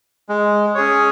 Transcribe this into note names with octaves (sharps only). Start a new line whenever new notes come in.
G#3
C#4 G#4 C#5